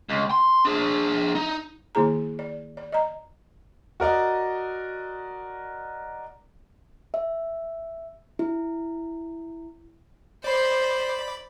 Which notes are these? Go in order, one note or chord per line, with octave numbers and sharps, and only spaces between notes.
C#2
C6
D4 G#4
D#4
D#3 A#3 E4 G#4 A#5
D5
D5
D#5 A#5
F#4 A#4 D5 D#5
E5
E4
C5 D5 B5